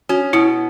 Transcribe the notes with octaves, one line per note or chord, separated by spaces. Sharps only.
C#4 F#4
B2 E4